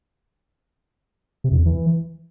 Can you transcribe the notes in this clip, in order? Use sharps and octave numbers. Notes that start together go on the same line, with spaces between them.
C3
F2
E2
E3